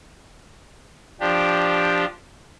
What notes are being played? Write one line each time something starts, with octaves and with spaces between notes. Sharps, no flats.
F3 D4 G4